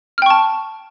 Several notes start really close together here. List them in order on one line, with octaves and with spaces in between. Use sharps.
F6 G5 C#6 A5